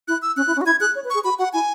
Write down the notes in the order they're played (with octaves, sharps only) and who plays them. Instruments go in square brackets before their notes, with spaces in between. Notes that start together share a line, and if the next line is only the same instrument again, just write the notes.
[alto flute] E4 [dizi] F#6
[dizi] E6
[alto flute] C#4 [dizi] F#6
[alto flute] E4
C#4
F#4
[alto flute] E4 [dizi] G#6
[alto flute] G#4 [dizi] F#6
[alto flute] C#5
B4
[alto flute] G#4 [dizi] C#6
[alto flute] F#4 [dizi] B5
[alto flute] F#4 [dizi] F#5
[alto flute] E4 [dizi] G#5